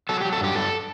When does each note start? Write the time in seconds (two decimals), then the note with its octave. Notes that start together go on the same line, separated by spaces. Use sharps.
0.09 F#3 A4
0.20 F#3 G4
0.33 A4
0.40 G2 G4
0.55 G2 A4